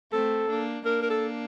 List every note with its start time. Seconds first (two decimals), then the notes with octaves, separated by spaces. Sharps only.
0.12 A3 C4 A4
0.49 A#3 D4
0.85 A#3 D4 A#4
1.02 A#4
1.10 A4